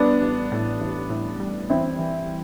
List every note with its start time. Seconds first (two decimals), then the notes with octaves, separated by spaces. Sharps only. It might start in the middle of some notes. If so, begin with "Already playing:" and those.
Already playing: G3 B3 D4
0.22 A1
0.52 A2
0.81 A1
1.10 A2
1.40 G3
1.69 E3 C4 E4
1.99 E3